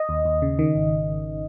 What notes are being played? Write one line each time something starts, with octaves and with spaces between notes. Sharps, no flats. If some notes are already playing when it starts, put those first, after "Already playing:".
Already playing: D#5
D#2
D#2
C#3
D#3
G#1